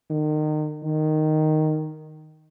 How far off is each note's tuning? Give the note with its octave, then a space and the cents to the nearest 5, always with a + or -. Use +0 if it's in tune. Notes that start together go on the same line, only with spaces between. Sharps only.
D#3 -30
D#3 -5